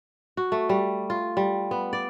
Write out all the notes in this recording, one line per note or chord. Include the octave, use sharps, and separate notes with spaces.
F#4
A3
G3
F4
G3
B3
D5